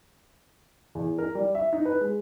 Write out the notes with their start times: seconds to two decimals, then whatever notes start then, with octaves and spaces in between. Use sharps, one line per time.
0.95 E2
1.18 A#4
1.35 G3
1.55 E5
1.73 D#4
1.85 B4
2.01 G#3